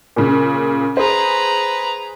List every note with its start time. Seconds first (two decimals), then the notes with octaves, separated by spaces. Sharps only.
0.16 A#2 C#3
0.97 G#4 B4 C5 A#5